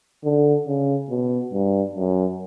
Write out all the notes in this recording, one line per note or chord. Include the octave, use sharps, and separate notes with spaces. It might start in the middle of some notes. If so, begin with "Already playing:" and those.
D3
C#3
B2
G2
F#2